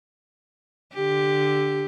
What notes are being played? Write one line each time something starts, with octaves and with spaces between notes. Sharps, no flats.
D3 G4